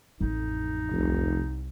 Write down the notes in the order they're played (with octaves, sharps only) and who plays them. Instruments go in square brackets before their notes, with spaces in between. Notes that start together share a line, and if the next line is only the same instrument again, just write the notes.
[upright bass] A1 F2 [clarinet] D#4
[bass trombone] F1 [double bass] C2